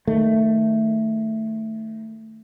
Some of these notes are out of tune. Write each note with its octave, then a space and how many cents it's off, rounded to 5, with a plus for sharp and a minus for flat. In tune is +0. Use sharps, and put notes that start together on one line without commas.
D#3 +0 A3 +5